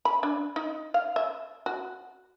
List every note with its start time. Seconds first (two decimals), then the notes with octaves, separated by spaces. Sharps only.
0.05 B5
0.23 D4
0.56 D#4
0.94 F5
1.16 E5
1.66 F#4